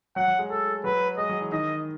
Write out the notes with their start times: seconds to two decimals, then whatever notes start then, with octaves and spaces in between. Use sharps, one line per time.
0.16 F#3 F#5
0.28 F#3
0.39 G#3
0.50 A3 A4
0.84 F#3 B4
1.17 G#3 D#5
1.29 F#3
1.41 E3
1.52 D#3 D#5